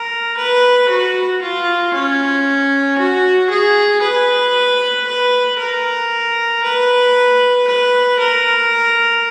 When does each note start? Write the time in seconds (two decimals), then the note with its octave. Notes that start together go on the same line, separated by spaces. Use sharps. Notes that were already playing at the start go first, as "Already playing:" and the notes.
Already playing: A#4
0.37 B4
0.89 F#4
1.41 F4
1.93 C#4
2.98 F#4
3.50 G#4
4.02 B4
5.07 B4
5.59 A#4
6.63 B4
7.67 B4
8.19 A#4